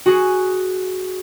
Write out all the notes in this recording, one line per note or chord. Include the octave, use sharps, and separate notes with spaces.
F#4 G#4